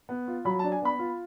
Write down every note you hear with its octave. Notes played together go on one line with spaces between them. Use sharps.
B3
F4
F#3 B5
A5
D4
G#5
B3 B5
F4